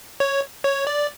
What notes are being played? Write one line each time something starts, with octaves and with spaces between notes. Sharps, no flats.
C#5
C#5
D5